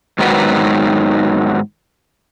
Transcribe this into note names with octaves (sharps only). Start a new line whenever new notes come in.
G#2 D#3 F#3 B3 F#4 B4